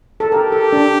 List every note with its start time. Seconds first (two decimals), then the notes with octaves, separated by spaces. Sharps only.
0.20 A4
0.31 G4 A#4
0.52 A4
0.73 D4